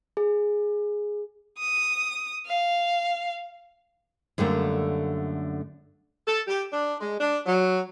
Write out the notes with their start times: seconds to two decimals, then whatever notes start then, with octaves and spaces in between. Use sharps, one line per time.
0.17 G#4
1.59 D#6
2.46 F5
4.38 F#2 D3 G3 A3 A#3
6.27 A4
6.47 G4
6.73 D4
7.01 G#3
7.20 D4
7.46 F#3